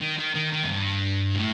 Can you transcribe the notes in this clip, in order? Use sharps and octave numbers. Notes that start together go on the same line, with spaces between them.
D#3
D#3
D#3
D#3
F#2
G2
A2